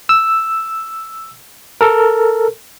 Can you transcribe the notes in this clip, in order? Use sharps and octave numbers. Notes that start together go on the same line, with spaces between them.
E6
A4 A#4